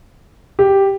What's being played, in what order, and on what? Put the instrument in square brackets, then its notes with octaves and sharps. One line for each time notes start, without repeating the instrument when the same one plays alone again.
[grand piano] G4